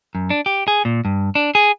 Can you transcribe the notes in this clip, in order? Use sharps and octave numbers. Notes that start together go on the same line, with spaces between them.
F#2
D4
G4
G#4
A#2
G2
D4
G#4